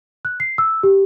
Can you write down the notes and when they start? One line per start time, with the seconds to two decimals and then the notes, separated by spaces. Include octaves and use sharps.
0.25 F#6
0.40 C7
0.58 E6
0.83 G4